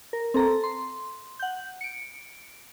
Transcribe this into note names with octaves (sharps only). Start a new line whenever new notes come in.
A#4
C4 A4 A#5
C6
F#5 G6
C#7 D7